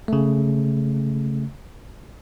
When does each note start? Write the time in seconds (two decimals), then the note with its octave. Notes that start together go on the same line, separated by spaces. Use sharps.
0.08 C#3 A3